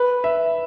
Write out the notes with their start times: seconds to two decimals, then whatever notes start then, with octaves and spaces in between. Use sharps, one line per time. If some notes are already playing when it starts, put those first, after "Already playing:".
Already playing: B4
0.24 E5